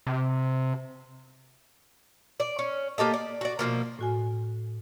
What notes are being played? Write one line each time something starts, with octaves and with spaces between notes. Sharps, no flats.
C3
D5
C#4
A#3 G4 A4 D#5
D5
F#4 D5
B2 D3 F3 A#3
A2 F#4 G#5